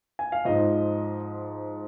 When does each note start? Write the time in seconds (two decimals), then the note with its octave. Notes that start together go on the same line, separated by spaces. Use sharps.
0.19 G#5
0.32 F5
0.45 G#2 F3 D#5